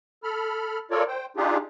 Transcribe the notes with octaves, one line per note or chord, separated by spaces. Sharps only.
A4 B5 F6
F4 A4 A#4 C#5 D5
C5 G5
D4 D#4 F4 G4 G#4